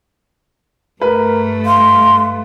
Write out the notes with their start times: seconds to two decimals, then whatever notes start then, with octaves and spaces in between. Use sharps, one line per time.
1.02 G2 A3 A#4 B4
1.66 F5 C6